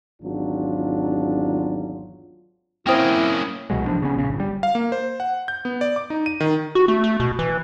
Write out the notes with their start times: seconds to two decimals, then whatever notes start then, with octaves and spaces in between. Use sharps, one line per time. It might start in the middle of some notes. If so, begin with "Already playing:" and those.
0.20 G#1 E2 F#3 D4 F4
2.87 A#3 C4 C#4 E4 C5 G5 D#6 F6
3.70 C2 B2 F#3 G#3
3.86 A1 F3 D4
4.02 C#3 B3 C#4
4.16 A#1 C#3
4.29 G1
4.40 G3
4.63 F5
4.75 A#3
4.92 C5
5.20 F#5
5.48 G6
5.65 B3
5.81 D5
5.96 D6
6.10 D#4
6.26 D#7
6.40 D#3
6.75 F#4
6.88 A3
7.04 A3
7.20 B2
7.39 E3